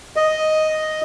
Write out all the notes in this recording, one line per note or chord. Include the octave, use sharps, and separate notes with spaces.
D#5